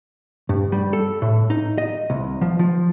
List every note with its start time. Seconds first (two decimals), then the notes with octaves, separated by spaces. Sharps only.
0.49 G2
0.72 G3
0.93 A4
1.22 A2
1.50 D#4
1.78 D#5
2.10 C2
2.41 F3
2.59 F3